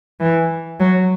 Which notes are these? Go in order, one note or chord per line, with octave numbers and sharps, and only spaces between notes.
E3
F#3